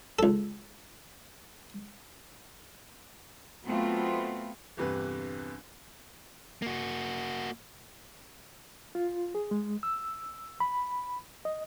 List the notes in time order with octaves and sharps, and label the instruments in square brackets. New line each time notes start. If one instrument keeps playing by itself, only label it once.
[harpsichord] C#2 A4
[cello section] F#3 A3 B3 C4 F4
[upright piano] G1 E2 G2 C3 B4 F#6
[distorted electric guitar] A#3 F#4
[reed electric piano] F4
G#4
G#3
E6
B5
D#5